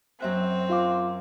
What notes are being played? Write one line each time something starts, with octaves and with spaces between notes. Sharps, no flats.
F#2 C4 E5 F#6
F4 F5 D6